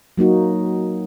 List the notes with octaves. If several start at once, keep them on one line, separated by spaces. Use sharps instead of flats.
F#3 A#3 D#4 F#4